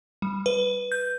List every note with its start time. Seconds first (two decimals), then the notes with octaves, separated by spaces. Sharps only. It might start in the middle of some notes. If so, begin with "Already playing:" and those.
0.22 G3
0.46 B4
0.92 G6